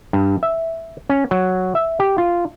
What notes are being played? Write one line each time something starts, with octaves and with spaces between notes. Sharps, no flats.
G2
E5
C#4
F#3
E5
G4
F4